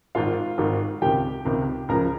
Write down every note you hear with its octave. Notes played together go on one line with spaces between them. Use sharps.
G#1 G#2 D#3 F4 F5
G#1 G#2 D#3
C#2 C3 D#3 G4 G5
C#2 C3 D#3
C#2 C#3 F3 A#4 A#5